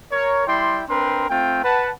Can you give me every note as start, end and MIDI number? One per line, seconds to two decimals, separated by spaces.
0.12 0.43 70
0.12 0.43 73
0.47 0.82 55
0.47 0.82 64
0.47 0.82 74
0.47 0.82 79
0.47 0.82 84
0.89 1.25 60
0.89 1.25 62
0.89 1.25 70
0.89 1.25 71
0.89 1.25 79
0.89 1.25 84
1.29 1.62 57
1.29 1.62 60
1.29 1.62 65
1.29 1.62 79
1.64 1.90 71
1.64 1.90 78
1.64 1.90 81